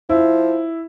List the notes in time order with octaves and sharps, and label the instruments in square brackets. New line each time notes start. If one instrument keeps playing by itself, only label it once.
[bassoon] F3 [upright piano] E4